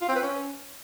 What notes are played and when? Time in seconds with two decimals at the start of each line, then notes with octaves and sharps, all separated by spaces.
0.02 F4
0.09 C4
0.16 B4
0.23 C#4